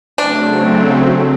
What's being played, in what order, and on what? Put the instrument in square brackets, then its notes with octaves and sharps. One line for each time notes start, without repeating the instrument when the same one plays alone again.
[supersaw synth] C#3 F#3 A3 C4 [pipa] D4